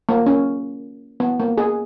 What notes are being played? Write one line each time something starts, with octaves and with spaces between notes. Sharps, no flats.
A#3
C#4
B3
A#3
G#4